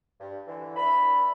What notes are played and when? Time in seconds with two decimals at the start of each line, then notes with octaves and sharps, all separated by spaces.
0.20 G2
0.47 D3 E3
0.77 D4 B4 E5 B5